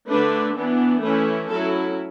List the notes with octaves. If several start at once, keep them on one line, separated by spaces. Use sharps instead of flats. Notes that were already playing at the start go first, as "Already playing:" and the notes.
D3 A3 D4 B4
E3 B3 D4
E3 A3 C#4 E4 B4
F#3 C#4 E4 A4